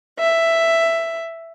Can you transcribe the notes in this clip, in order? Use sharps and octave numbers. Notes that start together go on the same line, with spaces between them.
E5